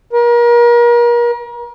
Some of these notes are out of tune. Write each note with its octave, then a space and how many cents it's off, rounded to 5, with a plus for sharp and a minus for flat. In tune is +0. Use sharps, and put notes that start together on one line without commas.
A#4 +35